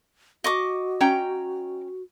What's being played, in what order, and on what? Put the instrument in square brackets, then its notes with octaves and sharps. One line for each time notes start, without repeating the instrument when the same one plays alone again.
[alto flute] F#4 [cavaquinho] D#5 C#6 D6
[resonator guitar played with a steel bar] C#4 G5 A#5